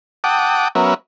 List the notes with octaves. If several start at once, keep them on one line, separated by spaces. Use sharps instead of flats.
F#5 G5 A5 D6 D#6
F#3 B3 C#4 A#4 E5